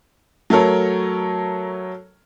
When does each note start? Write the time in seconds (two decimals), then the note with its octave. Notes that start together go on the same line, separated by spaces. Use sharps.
0.50 F#3 A3 A4 A#4 C#5